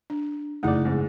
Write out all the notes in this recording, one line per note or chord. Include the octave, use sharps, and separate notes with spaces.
D4
F#1 A3 D#4 E4 D5 F#5
G#2